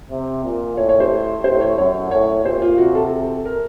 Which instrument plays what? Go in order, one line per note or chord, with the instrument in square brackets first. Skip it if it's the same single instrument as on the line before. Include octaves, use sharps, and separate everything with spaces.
[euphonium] C3
A#2
[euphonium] A2 [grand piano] C#5
[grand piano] C#5
C5
[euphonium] A2 [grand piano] C5
[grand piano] C#5
[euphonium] F#2 [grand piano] C#5
[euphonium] A2 [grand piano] C#5
[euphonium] A#2 [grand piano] C5
[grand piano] F4
[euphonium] C3 [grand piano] F#4
[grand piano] A4
A#4